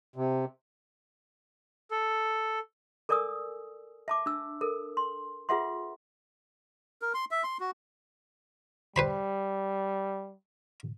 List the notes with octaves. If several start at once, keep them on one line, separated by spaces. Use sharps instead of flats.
C3
A4
A4 A#4 D5 G#5 D#6 E6
E5 A5 D6
D4 E6
A4 A#4
C6
F4 G#4 B4 E5 F#5 C6
A#4
C6
E5
C6
F#4
G3 B4 C5 B5